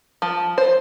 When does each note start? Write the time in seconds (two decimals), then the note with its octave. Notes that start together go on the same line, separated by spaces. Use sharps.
0.22 F3
0.58 C5